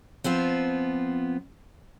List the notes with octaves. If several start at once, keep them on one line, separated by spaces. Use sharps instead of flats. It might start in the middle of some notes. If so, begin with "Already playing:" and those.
F3 B3 C4 F4